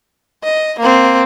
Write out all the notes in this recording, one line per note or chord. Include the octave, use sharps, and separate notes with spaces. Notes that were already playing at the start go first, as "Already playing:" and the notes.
D#5
A#3 C4